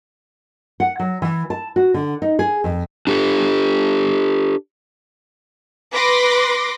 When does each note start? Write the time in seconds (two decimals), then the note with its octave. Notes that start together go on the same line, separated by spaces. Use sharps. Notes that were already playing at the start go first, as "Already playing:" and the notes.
0.80 F#5
0.99 F#3
1.22 E3
1.50 A5
1.76 F#4
1.94 D3
2.22 D#4
2.39 G#4
2.64 F2
3.07 D4 G4 A4
5.93 B4 C6 D6 A#6